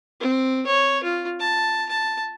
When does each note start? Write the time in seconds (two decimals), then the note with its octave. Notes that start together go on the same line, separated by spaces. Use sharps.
0.20 C4
0.67 C#5
1.04 F4
1.40 A5
1.89 A5